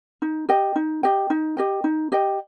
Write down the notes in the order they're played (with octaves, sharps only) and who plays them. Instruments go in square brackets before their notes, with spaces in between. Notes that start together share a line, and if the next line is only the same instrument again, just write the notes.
[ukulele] D#4
G4 D#5 G5
D#4
G4 D#5 G5
D#4
G4 D#5 G5
D#4
G4 D#5 G5